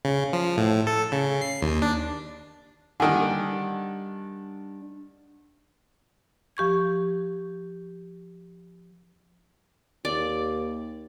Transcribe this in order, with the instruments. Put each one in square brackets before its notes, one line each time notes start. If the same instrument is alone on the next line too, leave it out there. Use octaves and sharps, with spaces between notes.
[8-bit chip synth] C#3
F3
A2
A4
C#3
C7
D#2
D4
[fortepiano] D3 D#3 [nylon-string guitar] G3 D4 G#5
[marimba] F3 G4 C#6 G#6
[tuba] D#2 [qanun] D5